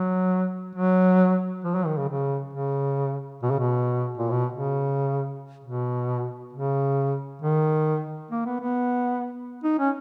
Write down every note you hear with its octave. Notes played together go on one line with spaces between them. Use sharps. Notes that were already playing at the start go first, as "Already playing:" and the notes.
Already playing: F#3
F#3
F3
F#3
D#3
C#3
C#3
C#3
B2
C#3
B2
A#2
B2
C#3
B2
C#3
D#3
A#3
B3
B3
D#4
C#4